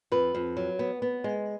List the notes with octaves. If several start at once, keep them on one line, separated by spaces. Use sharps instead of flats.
F2 B4
F2
F#3
B3
B3
G#3